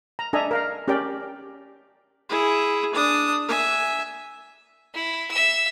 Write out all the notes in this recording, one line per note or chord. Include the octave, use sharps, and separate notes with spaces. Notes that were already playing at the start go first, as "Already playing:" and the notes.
A#5
D4 A4 D#5 E5 G#5 A#5
A#4 F5 A#5
C#4 G4 A#4 D5 G5
E4 G#4
D4 D#6
E5 G#5
E4
E5 E6